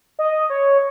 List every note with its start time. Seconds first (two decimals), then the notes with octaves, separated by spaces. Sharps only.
0.19 D#5
0.50 C#5